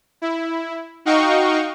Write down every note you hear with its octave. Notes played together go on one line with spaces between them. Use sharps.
E4
D#4 F#4 D#5 F5 G5 C#6